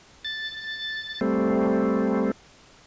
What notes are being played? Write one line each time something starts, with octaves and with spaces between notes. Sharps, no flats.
A6
G3 A3 C4